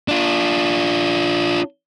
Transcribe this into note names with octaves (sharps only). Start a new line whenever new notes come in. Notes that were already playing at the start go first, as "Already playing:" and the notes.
D4 F4